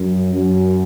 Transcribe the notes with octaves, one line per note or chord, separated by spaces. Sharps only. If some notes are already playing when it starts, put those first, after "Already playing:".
Already playing: F#2
F#2